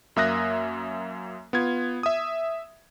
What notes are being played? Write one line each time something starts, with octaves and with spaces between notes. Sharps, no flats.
F#2 A#3 E5 D#6 F#6 A#6
B3 F4 G#6
E5 D#6